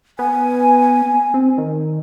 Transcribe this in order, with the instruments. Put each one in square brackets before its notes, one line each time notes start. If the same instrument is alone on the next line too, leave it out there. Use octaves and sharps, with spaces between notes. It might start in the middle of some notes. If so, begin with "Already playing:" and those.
[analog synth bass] B3 [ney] G#5
[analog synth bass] C4
D#3